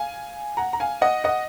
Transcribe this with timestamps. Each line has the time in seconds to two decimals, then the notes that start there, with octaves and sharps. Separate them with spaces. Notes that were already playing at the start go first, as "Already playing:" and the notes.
Already playing: F5 G#5
0.57 F#5 A#5
0.73 A#5
0.80 F5 G#5
1.02 D#5 F#5
1.24 D#5 F#5